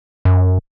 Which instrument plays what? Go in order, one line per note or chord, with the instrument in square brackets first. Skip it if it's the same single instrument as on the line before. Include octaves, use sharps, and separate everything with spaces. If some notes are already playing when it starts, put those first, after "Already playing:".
[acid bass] F#2